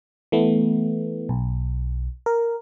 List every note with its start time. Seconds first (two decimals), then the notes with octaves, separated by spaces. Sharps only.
0.32 E3 A3 B3
1.29 B1
2.26 A#4